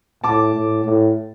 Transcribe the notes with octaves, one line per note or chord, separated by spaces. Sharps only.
A2 A5 D6
A2
A2